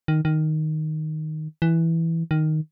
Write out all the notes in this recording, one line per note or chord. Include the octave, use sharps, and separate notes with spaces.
D#3
D#3
E3
D#3